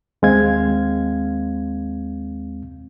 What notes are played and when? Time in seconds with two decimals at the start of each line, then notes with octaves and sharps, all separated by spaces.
0.22 D#2 G#3 C4 F5 G#6